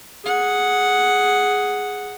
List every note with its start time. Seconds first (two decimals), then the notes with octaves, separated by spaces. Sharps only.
0.25 G#4 F#5